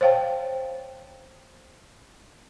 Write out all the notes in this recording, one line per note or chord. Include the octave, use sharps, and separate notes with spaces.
C5 C#5 F5 G5 A5